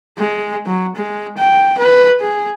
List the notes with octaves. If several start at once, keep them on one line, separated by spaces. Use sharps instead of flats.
G#3
F#3
G#3
G5
B4
G#4